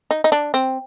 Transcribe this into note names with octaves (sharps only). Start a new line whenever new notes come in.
D#4
D#4
D4
C4